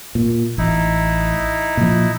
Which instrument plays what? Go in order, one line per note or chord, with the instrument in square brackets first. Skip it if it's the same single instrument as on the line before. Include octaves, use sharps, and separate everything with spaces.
[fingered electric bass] A#2
[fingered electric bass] A1 [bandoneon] D#4 E4
[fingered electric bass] A#2 F3